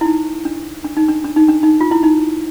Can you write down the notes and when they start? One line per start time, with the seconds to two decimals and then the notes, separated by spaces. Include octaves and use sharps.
0.01 E4
0.05 D#4
0.45 D4
0.84 D4
0.97 D#4
1.09 D4
1.24 D4
1.36 D#4
1.48 D4
1.63 D#4
1.81 F4
1.91 E4
2.03 D#4